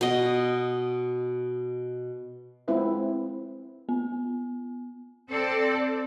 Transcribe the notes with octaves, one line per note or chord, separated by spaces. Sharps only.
B2 D#5
G#3 C4 E4 F4 B4
B3
C4 A4 C5 D5